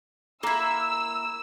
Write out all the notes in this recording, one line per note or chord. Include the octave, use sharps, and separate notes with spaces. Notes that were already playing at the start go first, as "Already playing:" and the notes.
A#3 E4 A#4 E6